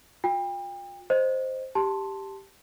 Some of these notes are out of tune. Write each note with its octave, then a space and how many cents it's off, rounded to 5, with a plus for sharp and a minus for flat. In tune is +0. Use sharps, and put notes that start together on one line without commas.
F4 +40 G5 +30
C5 +0 D#5 +0
G4 +0 A5 +0 C6 +5